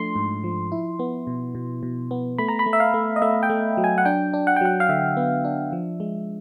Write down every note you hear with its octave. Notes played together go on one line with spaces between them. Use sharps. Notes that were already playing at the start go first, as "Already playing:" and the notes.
Already playing: F3 A3 D4 C6
G#2
F3
E4
B3
B2
B2
B2
B3
A3 B5
A#5
B5
A3
E5
F5
A3
D#5
A3 E5
G5
A3
F#3
G#5
F#5
D4 G5
D4
F#5
G5
F#3 F#5
F5
D3 E5
B3
D4
F3
G#3